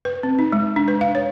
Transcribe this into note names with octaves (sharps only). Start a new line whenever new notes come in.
B4
C4
D#4
G#3
D4
B4
F5
C#5